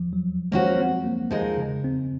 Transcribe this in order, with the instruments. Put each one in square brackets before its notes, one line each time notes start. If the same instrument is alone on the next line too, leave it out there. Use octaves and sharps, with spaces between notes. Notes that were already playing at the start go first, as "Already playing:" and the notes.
Already playing: [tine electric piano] F3
F#3
[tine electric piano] G#3 [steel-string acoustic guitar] A#3 C#4 F#4 C5
[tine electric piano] C4
A#3
[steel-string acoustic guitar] F3 G#3 D#4 A#4
[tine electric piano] C#3
C4